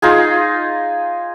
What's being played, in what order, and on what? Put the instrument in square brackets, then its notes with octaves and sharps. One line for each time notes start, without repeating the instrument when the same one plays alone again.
[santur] D#4 F4 G#4